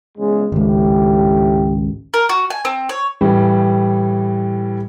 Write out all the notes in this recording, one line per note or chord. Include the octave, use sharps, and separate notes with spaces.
E2 C#3 G#3
G#1 C#2 A2 G4
A#4
F#4
G#5
C4
C#5
A2 E3 G3